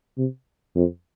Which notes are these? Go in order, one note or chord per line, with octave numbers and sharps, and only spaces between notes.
C3
F2